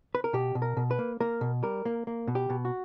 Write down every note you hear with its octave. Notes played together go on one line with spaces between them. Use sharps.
B4
A#4
B2 G4
B2
A#4
B2
B4
A#3
A#3 A#4
B2
G3 A#4
A#3
A#3
B2
G4
B2
F#4